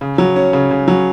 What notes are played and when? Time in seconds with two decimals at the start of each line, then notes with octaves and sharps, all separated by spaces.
0.01 C#3
0.18 F#3
0.36 C#4
0.53 C#3
0.71 C#3
0.88 F#3